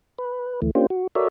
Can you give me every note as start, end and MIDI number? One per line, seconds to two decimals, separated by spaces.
0.18 0.60 71
0.62 0.71 38
0.62 0.71 52
0.62 0.71 57
0.75 0.86 58
0.75 0.86 61
0.75 0.86 62
0.75 0.86 65
0.75 0.86 67
0.75 0.86 72
0.90 1.07 66
1.15 1.28 66
1.15 1.28 69
1.15 1.28 70
1.15 1.28 73
1.15 1.28 74
1.15 1.28 76